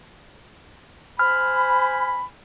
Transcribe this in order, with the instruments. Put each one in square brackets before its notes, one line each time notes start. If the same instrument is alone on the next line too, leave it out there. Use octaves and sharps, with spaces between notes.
[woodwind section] C5 G#5 B5 [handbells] F6